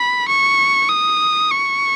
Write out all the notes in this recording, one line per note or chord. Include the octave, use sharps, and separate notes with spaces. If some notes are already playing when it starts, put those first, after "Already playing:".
Already playing: B5
C#6
D#6
C#6